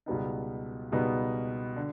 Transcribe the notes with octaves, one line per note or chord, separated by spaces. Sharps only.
C#2 B2 G3 B3 D#4
C#2 B2 G3 B3 D#4
D3